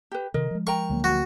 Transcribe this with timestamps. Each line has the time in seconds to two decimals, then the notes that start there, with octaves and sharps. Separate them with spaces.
0.11 G4 B4
0.34 C3 D#3 A#4 D#5
0.51 F3 G#3
0.67 A#4 G5 A#5 C#6
0.90 D2 F#3 A#3
1.04 F#4